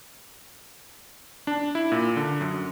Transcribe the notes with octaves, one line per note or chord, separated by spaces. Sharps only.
D4
E4
A#2
D3
F#2